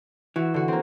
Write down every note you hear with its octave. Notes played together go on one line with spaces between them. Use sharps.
E3 F#4 E7
D3 F#4
A#3 C4